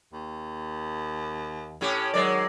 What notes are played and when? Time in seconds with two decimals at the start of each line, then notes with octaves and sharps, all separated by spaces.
0.13 D#2
1.81 A2 C#4 G4
2.14 D#3 F#3 G#3 D5